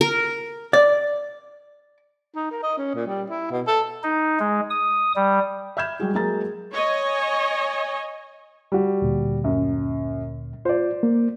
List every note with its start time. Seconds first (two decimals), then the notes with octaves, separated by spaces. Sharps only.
0.01 A#4
0.73 D5
2.35 D#4
2.51 A#4
2.63 D#5
2.78 C#4
2.95 A#2
3.07 G3
3.30 E4
3.51 B2
3.67 A4
4.03 D#4
4.40 G#3
4.70 D#6
5.16 G3
5.77 E5 B5 F6 G6 G#6 E7
6.00 G3 G#3 F#4 G#4
6.14 F#3 G#3 A#3 G#4 A#5 A6
6.73 C#5 D#5 G#5
8.72 G3 F#4
9.02 D2 A#2
9.44 F#2
10.65 F4 C5 D5
11.03 A#3